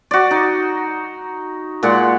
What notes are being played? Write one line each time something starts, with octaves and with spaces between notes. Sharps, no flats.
F#4 D5
D#4
A#2 G#3 D5 F#5